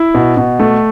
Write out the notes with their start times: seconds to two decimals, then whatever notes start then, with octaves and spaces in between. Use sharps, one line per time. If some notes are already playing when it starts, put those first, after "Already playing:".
Already playing: E4
0.15 B2
0.37 B2
0.59 A3